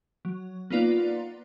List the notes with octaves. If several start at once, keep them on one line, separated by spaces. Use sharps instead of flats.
F#3
A#3 B3 D#4 F4 B4 D5